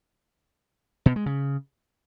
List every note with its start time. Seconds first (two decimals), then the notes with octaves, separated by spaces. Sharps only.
1.06 B2
1.16 G#3
1.26 C#3